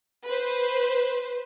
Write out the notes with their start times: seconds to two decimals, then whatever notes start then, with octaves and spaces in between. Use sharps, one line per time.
0.24 B4 C5